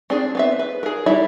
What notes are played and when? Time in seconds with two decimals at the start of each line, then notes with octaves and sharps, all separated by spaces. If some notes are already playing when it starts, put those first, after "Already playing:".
0.10 C4 D4 G#4
0.35 B3 C4 E5
0.59 B4
0.83 G#4 A#4
1.06 G3 E4 A#4 E5 B5